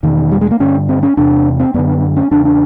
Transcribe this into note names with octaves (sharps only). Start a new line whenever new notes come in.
E2 B2 D#3
G3
G#3
A#3
G2 D3 C#4
C4
C#4
E2 C3 D4
C4
F#2 D3 B3
C#4
E2 C#3 D4
D4